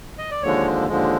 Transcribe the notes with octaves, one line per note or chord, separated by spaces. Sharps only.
D#5
D5
D#2 D3 F3 G#3 C#5
D#2 D3 F3 G#3